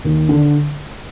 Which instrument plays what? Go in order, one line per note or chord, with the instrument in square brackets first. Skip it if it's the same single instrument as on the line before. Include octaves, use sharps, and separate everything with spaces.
[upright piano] D#2
D3